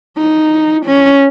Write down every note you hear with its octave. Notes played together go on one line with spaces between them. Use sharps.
D#4
C#4